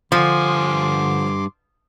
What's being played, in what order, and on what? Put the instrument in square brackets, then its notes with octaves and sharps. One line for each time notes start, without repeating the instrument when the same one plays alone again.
[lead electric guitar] G2 G#5 [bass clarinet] D3 [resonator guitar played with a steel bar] F3 [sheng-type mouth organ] C6 D6